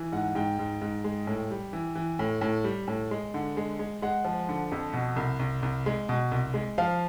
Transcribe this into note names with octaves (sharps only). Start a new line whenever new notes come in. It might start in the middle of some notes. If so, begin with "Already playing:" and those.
Already playing: E3
G#2 F#5
G#2 G5
G#2
G#2
G#3
A2
G3
E3
E3
A2
A2
G3
A2
G#3
D3
G#3
G#3
G#3 F#5
F3
D3
F2
B2
C2
C2
C2
G#3
B2
C2
G#3
F3 F5